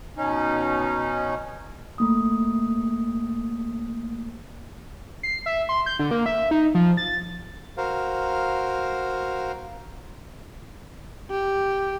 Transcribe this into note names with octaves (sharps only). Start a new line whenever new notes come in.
B2 C#4 D#4
A3 A#3 D#6
C7
E5
C6
G6
D3
A#3
E5
D#4
F3
A6
F#4 A#4 C5 F5
G4